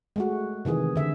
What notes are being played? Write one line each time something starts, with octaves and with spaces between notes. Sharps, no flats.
G#3 A3 F#4
C3 D#3 E3 G#4
D3 E5